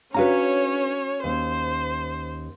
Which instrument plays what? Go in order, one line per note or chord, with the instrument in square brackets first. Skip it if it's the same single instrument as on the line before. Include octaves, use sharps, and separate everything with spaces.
[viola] C#4 C#5 [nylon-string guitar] D4 G#4 B4 [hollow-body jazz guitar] F#4 F5 A#5
[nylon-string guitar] D#2 C#4 [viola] C5